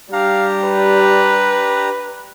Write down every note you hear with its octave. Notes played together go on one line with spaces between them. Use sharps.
G3 D4 G4 F5 A#5
B4